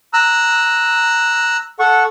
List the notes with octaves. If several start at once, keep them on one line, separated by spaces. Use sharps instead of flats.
A#5 E6 F#6
A4 F#5 C#6